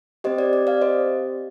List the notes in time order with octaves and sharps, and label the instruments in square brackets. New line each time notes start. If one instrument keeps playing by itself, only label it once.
[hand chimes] C4 G4 C5 D#5
D5
D5
D5 F5
C5 D#5